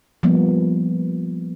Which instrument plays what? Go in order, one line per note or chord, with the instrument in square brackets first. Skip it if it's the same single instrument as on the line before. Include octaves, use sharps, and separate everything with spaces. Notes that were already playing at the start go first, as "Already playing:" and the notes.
[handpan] F3 G3 A#3 B3